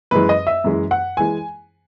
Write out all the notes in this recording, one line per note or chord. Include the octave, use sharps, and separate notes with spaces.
F#2 E3 G#3 B4
D#5
E5
F#2 E3 G#3
F#5
E3 G#3 G#5